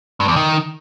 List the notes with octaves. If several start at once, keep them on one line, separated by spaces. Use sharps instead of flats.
G2
E2
D#3